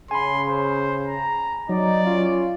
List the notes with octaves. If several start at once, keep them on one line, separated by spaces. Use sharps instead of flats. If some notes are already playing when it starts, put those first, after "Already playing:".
C#3 G#5 B5 C6
C5
A#5
F#3 D#4 D5
C#4 F4